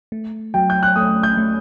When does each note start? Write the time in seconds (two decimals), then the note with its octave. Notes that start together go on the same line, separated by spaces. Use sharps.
0.12 A3
0.54 F#3 G5
0.70 G6
0.83 F#6
0.96 A3 D#6
1.23 G6
1.37 A3